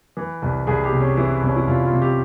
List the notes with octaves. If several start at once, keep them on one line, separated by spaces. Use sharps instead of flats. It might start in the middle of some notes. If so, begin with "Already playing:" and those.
E3
C2
C2 G#4
G4
C3
C#4
E3 E4
C2 C#4
E4
C2 F4
F4
C3
G4